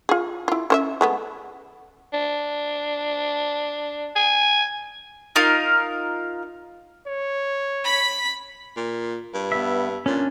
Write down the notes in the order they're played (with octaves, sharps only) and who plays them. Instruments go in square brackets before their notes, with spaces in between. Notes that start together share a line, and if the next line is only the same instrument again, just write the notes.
[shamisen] F4 G#4
E4 F4
C#4 C5 E5
G#3 A3 B3
[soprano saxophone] D4
G#5
[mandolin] D#4 F4 A#4 F5
[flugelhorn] C#5
[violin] B5 B6
[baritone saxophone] A#2
G2
[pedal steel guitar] B3 E5
[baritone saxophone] A#2 [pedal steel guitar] C#4 D4